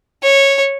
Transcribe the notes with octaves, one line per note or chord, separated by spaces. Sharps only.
C#5